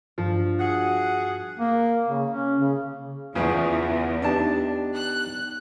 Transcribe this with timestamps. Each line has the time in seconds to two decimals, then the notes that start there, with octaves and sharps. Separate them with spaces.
0.18 G2 F3
0.60 F#4 G#4 F#5
1.59 A#3
2.08 C#3
2.30 C#4
2.60 C#3
3.35 E2 C#3 F3 B3
4.22 B3 D4 D#4 G4 A5
4.96 F#6